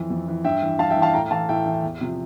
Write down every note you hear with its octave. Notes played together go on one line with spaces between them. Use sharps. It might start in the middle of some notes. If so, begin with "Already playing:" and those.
Already playing: F2 E3
F2
E3
G2 E5 G5
E3
G2 F5 A5
E5 G5
E3
F5 A5
A2 G5 A#5
E3 F5 A5
A2 E5 G5
E3
E2
C3 F3